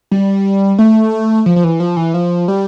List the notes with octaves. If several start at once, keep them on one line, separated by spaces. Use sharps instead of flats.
G3
A3
F3
F3
E3
F3
E3
F3
G3